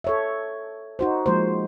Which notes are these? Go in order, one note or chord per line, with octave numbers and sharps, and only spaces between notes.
A4 C#5 E5
D#4 F#4 C5
F3 G#3 A#3 C5